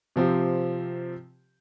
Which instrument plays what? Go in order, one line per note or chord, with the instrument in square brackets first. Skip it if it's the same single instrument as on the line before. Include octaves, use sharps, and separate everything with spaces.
[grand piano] C3 F3 C4 G4